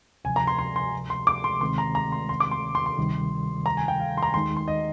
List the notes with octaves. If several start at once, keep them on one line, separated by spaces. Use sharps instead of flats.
D2 C3 F3 G#5
A#5
C6
C6
C6
C6
D6
C6
D2 C3 D#3 G#3 C4 C6
A#5
A#5
C6
C6
D6
C6
C6
C6
D2 C3 D#3 G3
A#5
G#5
G5
F5
C6
A#5
D#2 D#3 G#3 D#4 C6
C6
D#5